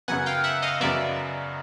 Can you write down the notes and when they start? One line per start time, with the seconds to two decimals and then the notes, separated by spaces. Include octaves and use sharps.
0.08 F#2 C#3 F#3 B3 F#5 G#5
0.26 F5 G5
0.44 E5 F#5
0.62 D#5 F5
0.80 F#2 C#3 F#3 B3 D5 E5